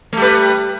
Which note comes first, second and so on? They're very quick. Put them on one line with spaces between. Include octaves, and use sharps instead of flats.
A3 G3 B4